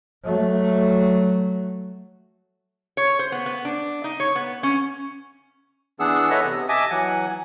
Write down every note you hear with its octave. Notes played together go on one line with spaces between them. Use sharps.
F#3 A3
C#5
C5
B3
B3
D4
D#4
C#5
B3
C#4
E3 B3 D4 G#4 F#5 E6
A4 B4 C#5 D#5 E5 F#5
C3 B3
D#5 E5 G#5 A5 D6 D#6
E3 F#3 F#5 G#5